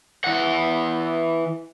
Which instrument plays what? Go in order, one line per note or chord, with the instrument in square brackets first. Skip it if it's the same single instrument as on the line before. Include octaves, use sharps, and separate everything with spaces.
[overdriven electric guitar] E3 F#5